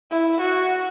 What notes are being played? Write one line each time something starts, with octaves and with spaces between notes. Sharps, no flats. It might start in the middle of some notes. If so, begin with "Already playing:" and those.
E4
F#4